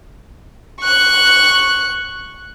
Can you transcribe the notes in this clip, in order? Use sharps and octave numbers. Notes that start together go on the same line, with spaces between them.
C#6 F#6